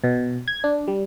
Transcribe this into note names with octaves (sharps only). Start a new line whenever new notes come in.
B2
G#6
D4
G3